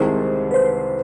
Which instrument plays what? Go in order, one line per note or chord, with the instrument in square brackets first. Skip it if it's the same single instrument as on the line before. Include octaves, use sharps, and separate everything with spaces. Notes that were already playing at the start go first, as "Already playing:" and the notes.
Already playing: [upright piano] C2 C3 D#3 G#3 [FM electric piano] C5
[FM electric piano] B4
C5